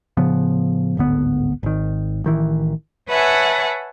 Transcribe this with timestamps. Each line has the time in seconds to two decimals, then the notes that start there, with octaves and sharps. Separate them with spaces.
0.17 A2 C#3 F3 B3
0.97 D1 G#1 D3 B3
1.63 G#1 D#3
2.24 A1 D#3 E3
3.09 B4 C#5 E5 F#5 G#5 A5